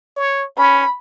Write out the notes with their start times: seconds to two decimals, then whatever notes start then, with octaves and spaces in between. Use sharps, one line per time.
0.16 C#5
0.58 C#4 B5